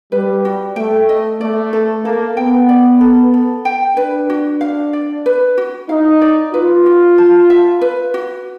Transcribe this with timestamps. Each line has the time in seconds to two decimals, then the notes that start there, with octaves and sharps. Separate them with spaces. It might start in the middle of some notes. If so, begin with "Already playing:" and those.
0.12 G3 B4
0.45 F#4
0.76 A3 G5
1.09 D#5
1.40 A3 D5
1.73 A4
2.05 A#3 A4
2.37 B3 G5
2.69 D5
3.01 A4
3.34 A4
3.65 G5
3.97 D4 B4
4.30 F#4
4.61 F5
4.93 D5
5.26 B4
5.58 F#4
5.89 D#4 F5
6.22 D5
6.54 F4 B4
6.86 F#4
7.18 A5
7.50 E5
7.81 B4
8.14 F#4